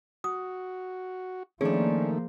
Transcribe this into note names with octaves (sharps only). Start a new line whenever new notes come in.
F#4 D#6
D#3 F3 A3 A#3 C#4 D4 G#4